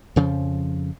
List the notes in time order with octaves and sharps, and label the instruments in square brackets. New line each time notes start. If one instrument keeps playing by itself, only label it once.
[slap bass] F2 C#3 F3